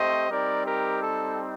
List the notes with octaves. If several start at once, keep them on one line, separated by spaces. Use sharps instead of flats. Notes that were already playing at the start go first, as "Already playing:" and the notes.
Already playing: A3 C4 G4 C5 D#5
G3 C4 D#4 G4 A#4 D5
G4 A#4
A4